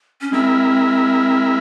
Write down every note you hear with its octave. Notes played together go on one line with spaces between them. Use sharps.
C#4
G#3 C4 E4 A#4 E5